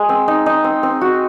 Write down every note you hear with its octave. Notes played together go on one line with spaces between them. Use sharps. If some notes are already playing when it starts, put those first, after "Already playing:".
Already playing: G#3
C4
D#4
D#4
C4
C4
F#4